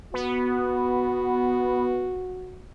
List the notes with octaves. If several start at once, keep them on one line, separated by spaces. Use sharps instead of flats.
B3 F#4